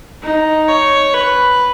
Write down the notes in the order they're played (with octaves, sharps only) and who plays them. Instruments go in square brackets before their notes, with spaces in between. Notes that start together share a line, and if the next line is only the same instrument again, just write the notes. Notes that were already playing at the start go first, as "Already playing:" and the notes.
[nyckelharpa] D#4
C#5
B4